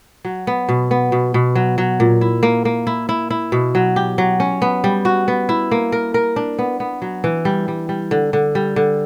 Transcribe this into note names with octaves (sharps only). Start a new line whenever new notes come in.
F#3
B3
B2
B3
B2
B2
F#3
F#3
A#2
E4
A#3
A#3
E4
E4
E4
B2
F#3
G4
F#3
C#4
B3
G3
F#4
B3
E4
A#3
A#4
A#4
D4
B3
B3
F#3
E3
G3
G3
G3
D3
D3
G3
D3